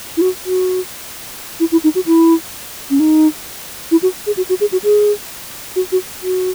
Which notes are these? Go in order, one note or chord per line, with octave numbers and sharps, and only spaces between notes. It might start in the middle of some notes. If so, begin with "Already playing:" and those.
E4
F#4
F#4
E4
E4
D#4
F#4
E4
C#4
D#4
E4
F#4
G#4
F#4
F#4
G#4
F#4
G#4
F#4
F#4
F#4